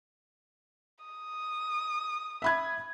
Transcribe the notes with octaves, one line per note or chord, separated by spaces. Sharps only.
D#6
E5 B5 G#6